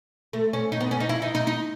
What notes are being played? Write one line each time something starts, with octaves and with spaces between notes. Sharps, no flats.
A3
C#4
D#4
B3
C#4
D#4
E4
D#4
D#4
D#4